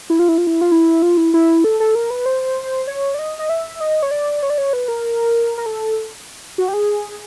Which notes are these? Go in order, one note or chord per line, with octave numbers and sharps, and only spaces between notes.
E4
F4
E4
F4
E4
F4
E4
F4
E4
E4
A4
A4
A#4
B4
C5
C#5
D5
D#5
D#5
E5
D#5
C#5
D5
C#5
D5
C#5
B4
A#4
A#4
A4
F#4
G4
G#4